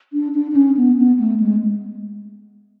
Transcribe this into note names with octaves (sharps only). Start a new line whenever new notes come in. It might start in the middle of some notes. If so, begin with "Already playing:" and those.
D4
D4
D4
C#4
B3
B3
A3
G#3